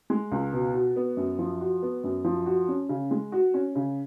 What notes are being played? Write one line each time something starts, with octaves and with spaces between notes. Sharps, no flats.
G#3
C#2
B2
F#4
B3
F#2
F3
F#4
B3
F#2
F3
F#4
C#4
C#3
G#3
F#4
C#4
C#3